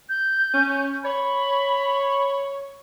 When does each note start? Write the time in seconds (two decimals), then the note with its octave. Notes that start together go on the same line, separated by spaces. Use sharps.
0.09 G6
0.54 C#4
1.04 C#5 B5